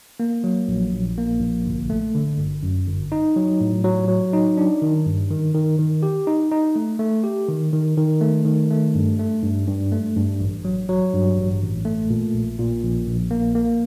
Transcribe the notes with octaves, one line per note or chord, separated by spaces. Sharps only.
A#3
F#3
A#1
A#1
A#3
A#1
G1
A3
D3
G1
F#2
G1
D#4
F#3
A2
F#3
F#3
D#4
D4
D#3
G2
D#3
D#3
D#3
G4
D#4
D#4
A3
A3
G4
D#3
D#3
D#3
A3
D#3
A3
G2
A3
G2
G2
A3
G2
A1
F#3
F#3
G2
A1
A1
A3
A#2
A#1
A#2
A#1
A#1
A#3
A#3